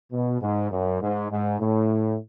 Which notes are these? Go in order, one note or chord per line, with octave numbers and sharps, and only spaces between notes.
B2
G#2
F#2
G#2
G#2
A2